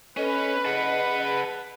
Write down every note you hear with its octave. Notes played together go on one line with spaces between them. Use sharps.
C#4 A4 B4 D#5
G#4 F#5 A5